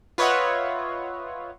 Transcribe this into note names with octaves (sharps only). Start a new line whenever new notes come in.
F4 B4 C#5 D#5 E5 F#5